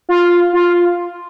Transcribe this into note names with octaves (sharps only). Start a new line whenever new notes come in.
F4
F4